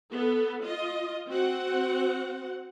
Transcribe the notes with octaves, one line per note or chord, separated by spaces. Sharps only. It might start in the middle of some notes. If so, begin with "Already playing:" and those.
B3 A4
F4 D#5
C4 F#4 F#5